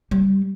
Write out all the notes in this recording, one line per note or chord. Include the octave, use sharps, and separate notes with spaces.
G3